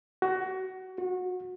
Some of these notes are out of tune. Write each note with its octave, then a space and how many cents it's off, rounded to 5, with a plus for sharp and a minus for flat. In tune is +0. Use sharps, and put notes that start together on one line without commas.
F#4 +20
F#4 -25